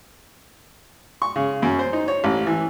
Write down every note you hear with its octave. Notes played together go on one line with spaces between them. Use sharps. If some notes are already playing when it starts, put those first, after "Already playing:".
C#6
C#3
F#2
C5
D#4
C#5
A1
E3